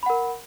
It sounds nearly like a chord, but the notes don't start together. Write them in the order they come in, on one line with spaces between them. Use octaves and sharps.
B5 F#5 A#4